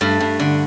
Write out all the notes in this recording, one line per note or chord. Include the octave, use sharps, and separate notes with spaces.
G2 A3
G2
D3